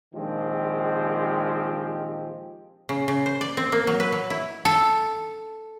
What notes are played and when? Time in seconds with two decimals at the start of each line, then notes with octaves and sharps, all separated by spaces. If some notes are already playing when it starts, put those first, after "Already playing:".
0.14 A#1 D#3 F3 G#3 C4 G4
2.89 C#3
3.08 C#3
3.26 C5
3.41 D5
3.57 C4
3.72 A#3
3.87 F#3
4.00 B4
4.12 F#3
4.30 E4
4.65 A4